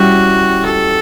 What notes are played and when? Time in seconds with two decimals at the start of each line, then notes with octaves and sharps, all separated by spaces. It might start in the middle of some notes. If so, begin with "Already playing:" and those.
Already playing: G3 C#4 E4 F#4 G4
0.64 A4